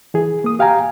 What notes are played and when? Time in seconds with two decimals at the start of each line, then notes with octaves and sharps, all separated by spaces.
0.14 E3 G#4
0.44 A#3 D#6
0.59 G4 F5 G5 G#5 A#5